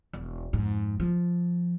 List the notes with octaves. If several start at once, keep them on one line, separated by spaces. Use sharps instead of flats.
E1
F2 G#2
F3